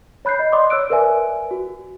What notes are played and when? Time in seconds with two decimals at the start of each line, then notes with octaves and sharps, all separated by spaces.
0.25 C#5 B5 F#6 G6 C7
0.39 D#5
0.52 D5 D#5 C6 D6 D#6
0.70 C#5 E6 F#6 D7
0.90 A#4 B4 D5 E5 G#5
1.51 F#4